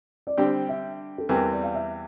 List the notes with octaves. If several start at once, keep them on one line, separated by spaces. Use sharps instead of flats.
D5
D3 G3 C4 G4 C5
E5
A4
E2 E3 G3 C4 A#4
D5
F5
E5